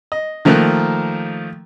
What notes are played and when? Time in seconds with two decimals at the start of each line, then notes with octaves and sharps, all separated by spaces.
0.12 D#5
0.45 D#3 F3 A3 A#3 A#4 F#6